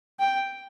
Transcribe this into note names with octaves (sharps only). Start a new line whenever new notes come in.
G5